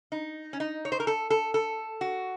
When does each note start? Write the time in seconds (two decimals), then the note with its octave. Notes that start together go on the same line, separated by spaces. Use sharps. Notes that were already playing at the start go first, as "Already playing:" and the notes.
0.12 D#4
0.53 C#4
0.60 D#4
0.85 C#5
0.92 C5
1.00 A#4
1.07 A4
1.30 A4
1.54 A4
2.01 F#4